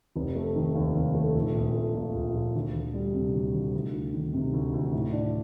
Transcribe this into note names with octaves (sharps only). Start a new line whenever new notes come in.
F1
A3
D#3
D#2
F1
A3
A#1
A#1
A3
A#2
A#1
A#1
D2
D2
G3
C3
D2
D2
D2
D2
D#3
C3
D2
D2
A2
D4